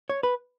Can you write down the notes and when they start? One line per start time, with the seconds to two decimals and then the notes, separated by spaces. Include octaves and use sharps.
0.09 C#5
0.23 B4